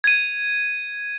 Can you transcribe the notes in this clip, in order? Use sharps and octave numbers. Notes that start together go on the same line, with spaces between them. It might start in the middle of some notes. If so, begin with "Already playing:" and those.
G#6 D#7